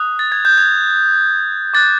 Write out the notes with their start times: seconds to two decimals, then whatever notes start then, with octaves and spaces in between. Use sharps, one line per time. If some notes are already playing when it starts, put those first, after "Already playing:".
Already playing: D#6 F#6
0.19 A6
0.32 G#6
0.45 G6
0.58 G#6
1.74 D6 F#6 A6